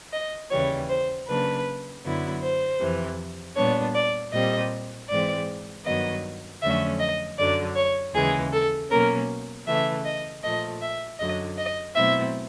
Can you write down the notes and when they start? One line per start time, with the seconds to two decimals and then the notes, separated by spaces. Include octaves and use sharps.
0.13 D#5
0.50 D#2 C#3 E3 G3 C#5
0.89 C5
1.27 C#3 F#3 A#3 D4 B4
2.04 F#2 D3 F#3 B3 E4
2.42 C5
2.80 F2 C3 E3
3.56 A#2 G3 B3 D4 C#5
3.94 D5
4.32 A#2 G3 C4 D#5
5.09 G#2 E3 G#3 C4 D5
5.85 G2 D#3 F#3 B3 D#5
6.62 F2 D3 F#3 A3 C#4 E5
7.00 D#5
7.38 F#2 D3 F#3 D5
7.76 C#5
8.14 D#2 C#3 E3 G#3 G#4
8.52 A4
8.90 B2 F#3 A#3 C#4 A#4
9.67 C#3 E3 A3 E5
10.05 D#5
10.43 A#2 F3 A3 D#5
10.81 E5
11.19 F#2 D3 F#3 D#5
11.58 D#5
11.95 B2 F#3 A3 C4 E4 E5